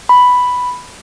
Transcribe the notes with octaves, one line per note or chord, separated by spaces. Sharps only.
B5